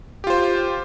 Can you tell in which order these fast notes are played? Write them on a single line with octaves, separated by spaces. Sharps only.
G4 F4 C5